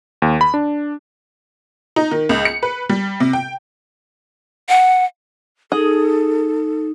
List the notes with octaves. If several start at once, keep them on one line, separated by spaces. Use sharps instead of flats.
D#2
B5
D4
D#4
D#3
C#2
C#7
B4
G3
C3
G5
F#5
D#4 G#4 A4